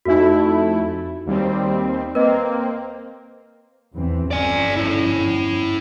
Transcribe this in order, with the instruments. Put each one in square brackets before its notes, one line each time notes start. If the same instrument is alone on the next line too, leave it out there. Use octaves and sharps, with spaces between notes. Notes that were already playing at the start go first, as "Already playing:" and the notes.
[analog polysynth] F2 A3 E4 [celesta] D#4 F#4
[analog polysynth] D#2 G3 C4
[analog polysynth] A#3 C4 [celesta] B4 D#5
[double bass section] E2 E3 C4
[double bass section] G1 F2 C#4 [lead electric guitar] D5 G#5
[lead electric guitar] E4 C#5